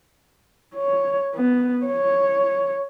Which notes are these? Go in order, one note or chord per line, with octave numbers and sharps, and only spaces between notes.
C#5
B3
C#5